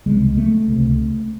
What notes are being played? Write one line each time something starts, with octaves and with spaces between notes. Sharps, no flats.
C#2 C3 G#3
A3
C#2 C3